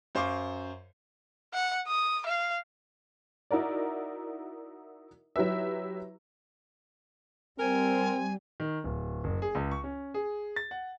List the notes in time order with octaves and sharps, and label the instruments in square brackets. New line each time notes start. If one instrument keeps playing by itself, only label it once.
[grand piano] F#2 C5 F5 C#6 D6
[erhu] F#5
D#6
F5
[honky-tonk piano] D#4 E4 F#4 A#4 D5
F#3 E4 G4 B4 E5
[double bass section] G3 [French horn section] C4 [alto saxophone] A#4 [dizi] G#5
[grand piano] D#3
D1
F#1
G#4
C#2
C#6
C#4
G#4
A6
F#5